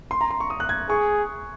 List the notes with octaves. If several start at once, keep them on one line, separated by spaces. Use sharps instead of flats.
C6
A#5
C6
C#6
D#6
F#6
G#6
G#4 C#6